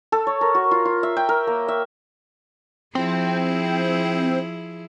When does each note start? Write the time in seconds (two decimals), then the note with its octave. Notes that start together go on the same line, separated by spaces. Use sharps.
0.12 A4
0.27 C#5
0.41 A#4
0.55 F#4
0.71 F4
0.85 F4
1.03 E5
1.17 G5
1.29 A#4
1.47 A#3
1.68 E5
2.95 F3 C4 E4 G#4